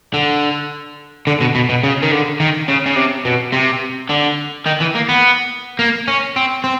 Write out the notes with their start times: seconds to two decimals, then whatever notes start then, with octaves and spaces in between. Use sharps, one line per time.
0.14 D3
1.27 D3
1.41 B2
1.55 B2
1.69 B2
1.83 C#3
2.02 D#3
2.11 D3
2.40 D#3
2.69 C#3
2.86 C#3
2.96 C3
3.25 B2
3.53 C3
4.10 D3
4.66 D#3
4.80 E3
4.95 A#3
5.09 B3
5.79 A#3
6.08 C#4
6.36 C4
6.64 C4